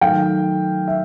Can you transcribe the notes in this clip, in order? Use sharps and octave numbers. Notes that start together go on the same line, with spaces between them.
D#3 F#3 A3 F5 G5
E5